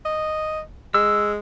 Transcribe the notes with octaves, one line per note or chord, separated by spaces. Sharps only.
D#5
G#3 E6